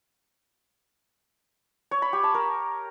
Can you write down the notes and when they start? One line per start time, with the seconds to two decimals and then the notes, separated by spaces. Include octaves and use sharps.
1.91 C#5
2.02 B5
2.13 G4
2.24 A5
2.34 A#4